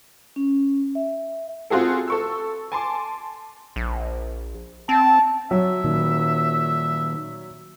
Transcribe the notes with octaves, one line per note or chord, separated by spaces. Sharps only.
C#4
E5
C4 F4 F#4 G#4 A4
A4 C#6 E6
G#5 A5 C6 D6
A#1
C4 A5
F#3 E5
A#2 D#3